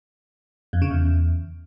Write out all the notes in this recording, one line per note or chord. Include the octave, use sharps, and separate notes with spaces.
F2
C#3
E2